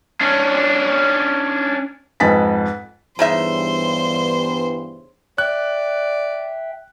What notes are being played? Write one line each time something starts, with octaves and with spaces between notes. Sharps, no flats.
C#4 D4
F2 G#2 B4 G#5 A6 B6
G2 C#3 E3 B3 D#4 C5 E5
D5 E5 G5 F#6